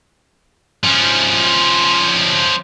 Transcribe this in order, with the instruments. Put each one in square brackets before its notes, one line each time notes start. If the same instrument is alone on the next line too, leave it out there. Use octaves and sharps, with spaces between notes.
[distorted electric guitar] F3 C#4